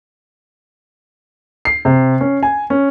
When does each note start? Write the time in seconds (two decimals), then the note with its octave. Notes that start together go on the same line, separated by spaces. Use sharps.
1.65 C7
1.85 C3
2.21 C#4
2.43 G#5
2.70 C#4